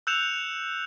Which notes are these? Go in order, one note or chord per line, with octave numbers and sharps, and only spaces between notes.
E6 F#6 G6 C#7 E7 F7